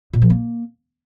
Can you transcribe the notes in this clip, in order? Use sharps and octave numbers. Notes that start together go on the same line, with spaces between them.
A#2
F3
A#3